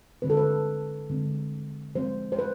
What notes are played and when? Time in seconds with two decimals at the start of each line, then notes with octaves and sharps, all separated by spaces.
0.22 D3 G#3 C4 B4
0.30 A4
0.37 B4
1.10 D3 G#3 C4
1.95 F3 G#3 C4 C5
2.32 C5
2.39 B4